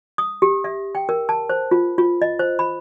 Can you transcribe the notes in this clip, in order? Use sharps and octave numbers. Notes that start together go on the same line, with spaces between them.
D#6
G4
E5
G5
A#4
A5
C5
F4
F4
D#5
C5
B5